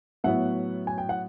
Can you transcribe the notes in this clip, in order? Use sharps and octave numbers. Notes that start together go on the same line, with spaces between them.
A2 F#3 B3 E5 F#5
G#5
G5
F#5